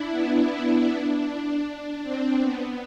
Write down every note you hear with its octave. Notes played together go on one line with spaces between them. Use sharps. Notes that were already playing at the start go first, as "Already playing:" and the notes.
Already playing: D4 E4
B3
B3
D4
D4
C4
B3